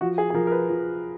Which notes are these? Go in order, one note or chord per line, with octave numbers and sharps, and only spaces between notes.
F3 F#4
G#4
G#4
F3 A#4
A#4
B4
F3